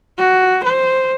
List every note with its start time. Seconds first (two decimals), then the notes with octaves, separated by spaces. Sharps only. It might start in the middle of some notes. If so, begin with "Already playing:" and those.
0.18 F#4
0.63 C5